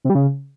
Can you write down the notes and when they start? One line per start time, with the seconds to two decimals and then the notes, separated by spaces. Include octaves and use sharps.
0.04 C3
0.10 G3
0.15 C#3